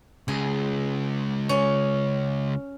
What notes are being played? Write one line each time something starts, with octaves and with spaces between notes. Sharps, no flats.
C#2 G#4
C#4